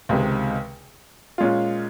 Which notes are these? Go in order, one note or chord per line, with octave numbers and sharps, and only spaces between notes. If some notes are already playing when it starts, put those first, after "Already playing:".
C#2 C3 D#3 G#3
A#2 G#3 C#4 F4